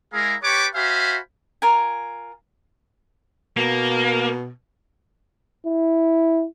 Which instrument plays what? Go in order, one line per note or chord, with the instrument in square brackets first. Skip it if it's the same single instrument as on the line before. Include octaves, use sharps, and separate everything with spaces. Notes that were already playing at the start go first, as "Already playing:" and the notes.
[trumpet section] G#3 E4 G#4 A#4 F5 A#5
G4 B4 C#5 A5 C#6 D6
F#4 C5 E5 F5 G#5 B5
[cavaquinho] F4 A#4 G#5
[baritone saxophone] B2 [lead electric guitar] A#3
[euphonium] E4